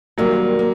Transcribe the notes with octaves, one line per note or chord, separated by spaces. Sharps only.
D#3 F#3 G3 A#3
A#3